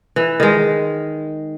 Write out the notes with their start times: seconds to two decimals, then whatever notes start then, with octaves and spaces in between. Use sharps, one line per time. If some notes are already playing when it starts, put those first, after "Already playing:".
0.16 E3
0.40 D#3 G#3